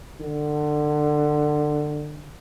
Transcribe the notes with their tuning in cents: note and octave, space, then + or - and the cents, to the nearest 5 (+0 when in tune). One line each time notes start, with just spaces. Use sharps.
D3 +25